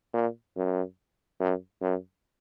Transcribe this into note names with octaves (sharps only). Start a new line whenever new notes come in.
A#2
F#2
F#2
F#2